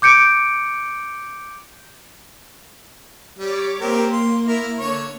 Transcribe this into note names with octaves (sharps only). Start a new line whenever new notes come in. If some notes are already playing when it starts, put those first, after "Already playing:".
D6 G6 C#7 D7
G3 C#5 D6
A#3 C4 G4 A#4
C6
E4 A#4
D3 C#5 C#6